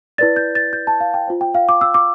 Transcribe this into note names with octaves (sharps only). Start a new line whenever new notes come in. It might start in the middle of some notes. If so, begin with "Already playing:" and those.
E4 B4 D5 A6
G6
A6
G6
A5
F5
G5
F4 C5
G5
F5
D6
E6
D6